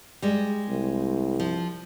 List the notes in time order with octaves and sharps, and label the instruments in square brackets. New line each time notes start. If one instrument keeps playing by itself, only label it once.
[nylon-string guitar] G3 G#3
[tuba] C2
[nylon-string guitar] F3